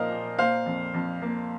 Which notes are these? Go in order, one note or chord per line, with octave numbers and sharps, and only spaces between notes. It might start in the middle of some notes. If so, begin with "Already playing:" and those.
Already playing: A#2 F3 A#3 A#4 C5 D#5 F5
A#2
A#3 C5 F5
F2
F2
A#3